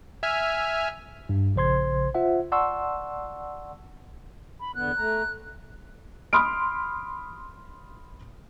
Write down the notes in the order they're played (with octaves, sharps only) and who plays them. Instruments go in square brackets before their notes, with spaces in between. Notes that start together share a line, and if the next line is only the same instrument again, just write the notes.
[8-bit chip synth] E5 G#5 F6
[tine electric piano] G2
A#1 C#3 C5 C6 G#6
F4 C5 E5 F#5
D5 F#5 A5 C6 C#6 E6
[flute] B5
[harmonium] E2 D3 B3 [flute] F#6
[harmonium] A3 A#5
[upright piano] B5 C6 D#6 F6 D7